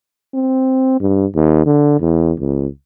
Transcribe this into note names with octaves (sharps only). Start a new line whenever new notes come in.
C4
G2
D#2
D3
E2
C#2